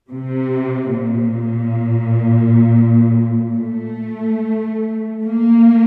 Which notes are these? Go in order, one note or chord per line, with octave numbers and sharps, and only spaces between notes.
C3
A#2
A3
A#3